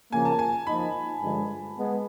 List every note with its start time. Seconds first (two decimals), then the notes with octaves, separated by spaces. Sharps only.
0.12 C#3 F3 A#3 G#5
0.25 A5
0.39 G#5
0.67 F3 A#3 D#4 B5
1.22 G2 D3 F3 G#3
1.77 G#3 B3